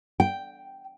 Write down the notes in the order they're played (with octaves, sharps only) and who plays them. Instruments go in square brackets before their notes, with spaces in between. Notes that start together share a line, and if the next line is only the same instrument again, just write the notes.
[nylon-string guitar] G5